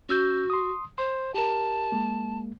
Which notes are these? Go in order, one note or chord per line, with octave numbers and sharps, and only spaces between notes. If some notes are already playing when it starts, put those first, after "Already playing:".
C#4 F#4 E6 G6
C6 D#6
C5 C6
G4 A#4 A5
G#3 A#3